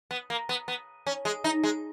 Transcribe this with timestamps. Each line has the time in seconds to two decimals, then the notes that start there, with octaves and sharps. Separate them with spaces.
0.11 B3
0.30 A#3
0.49 B3
0.68 B3
1.06 C#4
1.25 G#3
1.44 D#4
1.63 G#3